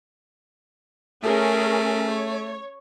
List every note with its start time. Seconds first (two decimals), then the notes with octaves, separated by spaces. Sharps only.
1.23 A3 C#4 G#4 A#4
2.07 C#5